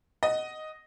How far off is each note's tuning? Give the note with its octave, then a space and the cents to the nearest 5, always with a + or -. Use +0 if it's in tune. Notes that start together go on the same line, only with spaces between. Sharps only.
D#5 +0 F#5 +10